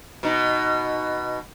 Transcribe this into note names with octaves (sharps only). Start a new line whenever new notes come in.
B2 D#4